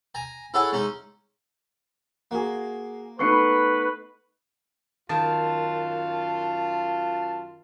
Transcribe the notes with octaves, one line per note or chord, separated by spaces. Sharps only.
G#5 A#5
E4 G#4 A4 C#5 F#5
G#3 C#4 D#4
A#3 F#4 G#4
A3 B3 D#4 B4 C#6 C7 C#7
F#2 D#3 F4 A5